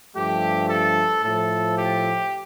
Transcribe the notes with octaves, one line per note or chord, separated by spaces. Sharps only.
G2 F3 A3 G4
A4
A2 F3 A3 A4
G4